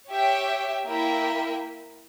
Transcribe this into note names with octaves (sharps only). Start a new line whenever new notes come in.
G4 C#5 E5 G5
A#3 E4 A#4 E5 G5